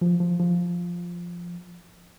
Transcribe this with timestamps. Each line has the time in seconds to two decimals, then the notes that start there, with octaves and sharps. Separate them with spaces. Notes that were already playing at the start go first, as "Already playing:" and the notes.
0.01 F3
0.20 F3
0.40 F3